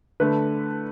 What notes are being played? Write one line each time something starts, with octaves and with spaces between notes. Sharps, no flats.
D3 A3 B4